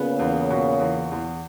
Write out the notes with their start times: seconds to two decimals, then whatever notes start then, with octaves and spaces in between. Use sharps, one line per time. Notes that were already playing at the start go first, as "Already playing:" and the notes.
Already playing: A#2 C#3 B3
0.19 E2
0.50 B2
0.80 E2
1.11 E2